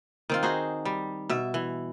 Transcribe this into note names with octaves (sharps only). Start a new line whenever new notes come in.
D#3 C4 F4
D#4 F#4 G#4 C5
G3
B2 E5
E3